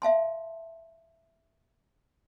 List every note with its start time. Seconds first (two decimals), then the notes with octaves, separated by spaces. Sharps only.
0.02 E5 F5 A5 C6